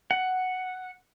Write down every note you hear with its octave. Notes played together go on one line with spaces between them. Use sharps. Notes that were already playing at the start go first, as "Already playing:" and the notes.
F#5